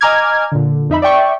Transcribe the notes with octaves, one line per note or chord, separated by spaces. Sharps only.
D#5 G#5 A#5 D6 F6 G#6
A#2 D3
F2 D#4 E5 B5
D5 E5 G5 C#6